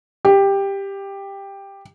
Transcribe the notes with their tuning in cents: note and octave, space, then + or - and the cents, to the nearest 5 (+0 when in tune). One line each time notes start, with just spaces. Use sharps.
G4 +10